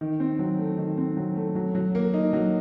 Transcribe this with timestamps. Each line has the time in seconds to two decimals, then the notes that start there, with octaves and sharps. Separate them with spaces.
0.01 D#3
0.20 C4
0.39 F#3
0.59 A3
0.78 D#3
0.98 C4
1.17 F#3
1.36 A3
1.55 F#3
1.75 F#3
1.95 A#3
2.14 D#4
2.33 F#3